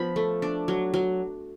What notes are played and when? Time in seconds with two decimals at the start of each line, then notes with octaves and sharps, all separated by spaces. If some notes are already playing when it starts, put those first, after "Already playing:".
Already playing: F3 B3 D4 B5
0.16 A3
0.42 D4
0.68 F#3
0.94 F#3